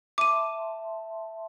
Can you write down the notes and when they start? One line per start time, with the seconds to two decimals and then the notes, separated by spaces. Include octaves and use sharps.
0.18 E5 A5 C6 D6 D#7